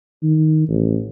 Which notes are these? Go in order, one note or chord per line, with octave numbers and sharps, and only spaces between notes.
D#3
A1